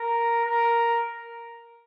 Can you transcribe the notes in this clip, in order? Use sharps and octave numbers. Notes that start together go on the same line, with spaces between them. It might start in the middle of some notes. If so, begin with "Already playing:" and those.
Already playing: A#4
A#4